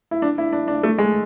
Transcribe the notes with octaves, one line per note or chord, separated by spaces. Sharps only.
E4
D4
E4
D4
D4
A3
G#3